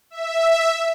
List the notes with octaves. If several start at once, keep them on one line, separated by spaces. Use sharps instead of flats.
E5